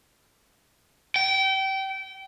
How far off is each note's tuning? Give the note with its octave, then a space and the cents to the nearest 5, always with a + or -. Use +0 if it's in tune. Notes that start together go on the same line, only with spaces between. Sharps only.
G5 -25